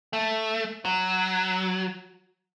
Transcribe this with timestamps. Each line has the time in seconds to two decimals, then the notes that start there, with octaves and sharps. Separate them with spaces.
0.13 A3
0.85 F#3